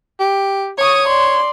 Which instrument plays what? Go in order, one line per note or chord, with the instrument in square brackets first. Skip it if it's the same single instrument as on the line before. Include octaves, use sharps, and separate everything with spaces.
[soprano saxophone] G4
[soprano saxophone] C#5 [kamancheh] C#6 D#6
[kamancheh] D5 C6